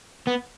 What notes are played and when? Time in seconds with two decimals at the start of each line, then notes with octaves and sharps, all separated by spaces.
0.27 B3